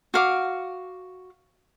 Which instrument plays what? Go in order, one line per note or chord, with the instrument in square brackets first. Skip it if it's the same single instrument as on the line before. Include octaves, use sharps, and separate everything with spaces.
[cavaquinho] F#4 F5 D6